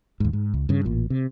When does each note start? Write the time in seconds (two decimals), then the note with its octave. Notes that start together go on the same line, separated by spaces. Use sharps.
0.20 D#2 G#2
0.33 G#2
0.54 C#2
0.69 G2 C#3
0.85 A1 A#2
1.10 C3